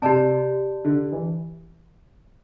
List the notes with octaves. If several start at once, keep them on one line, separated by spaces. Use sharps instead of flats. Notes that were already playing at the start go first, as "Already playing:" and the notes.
C3 G4 D5 A5
D3
E3